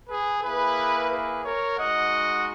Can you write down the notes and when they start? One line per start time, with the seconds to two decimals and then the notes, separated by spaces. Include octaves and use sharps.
0.09 G#4 B4
0.43 A#3 E4 G#4 B4
1.10 G#4 B4
1.45 A#4 C#5
1.78 G#3 D#4 F#4 D#5 F#5